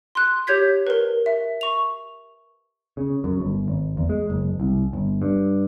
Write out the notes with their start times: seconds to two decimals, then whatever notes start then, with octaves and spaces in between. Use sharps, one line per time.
0.15 C6 F#6
0.47 G4 C#5 G6 G#6 B6
0.87 A#4 B4
1.26 E5
1.61 C#6 F7
2.97 C#3
3.24 F#2
3.40 G1
3.68 G#1
3.97 E2
4.09 G#3
4.30 F#1
4.60 C2
4.93 G1
5.22 G2